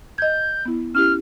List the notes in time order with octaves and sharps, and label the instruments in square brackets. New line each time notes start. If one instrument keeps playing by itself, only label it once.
[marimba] D#5 G#6 [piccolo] G6
[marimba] B3 E4
[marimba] C#4 E4 G4 [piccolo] F6